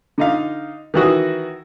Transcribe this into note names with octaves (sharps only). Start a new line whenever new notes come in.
D3 D#4 F5
D#3 E3 F#4 D#6